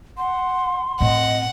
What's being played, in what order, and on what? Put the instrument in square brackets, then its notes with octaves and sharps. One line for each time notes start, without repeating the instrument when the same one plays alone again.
[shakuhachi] F#5 [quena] C6
[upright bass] A2 C4 [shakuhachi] D#5 [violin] F#5